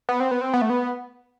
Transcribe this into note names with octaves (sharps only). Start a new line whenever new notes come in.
B3
C4
B3
C4
B3
A3
B3